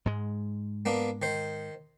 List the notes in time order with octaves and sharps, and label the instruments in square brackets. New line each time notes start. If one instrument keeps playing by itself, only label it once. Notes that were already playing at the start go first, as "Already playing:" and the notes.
[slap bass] G#2 G#3
[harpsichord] A#3 B3 D4
D#3 C5